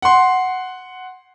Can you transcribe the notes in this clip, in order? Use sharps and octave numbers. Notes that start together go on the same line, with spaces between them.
F#5 C6